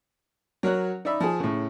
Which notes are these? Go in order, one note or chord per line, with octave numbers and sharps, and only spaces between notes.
F#3 A#4 C#5 F#6
D#4 D5 E5 B5
F3 G#4
A2 C#3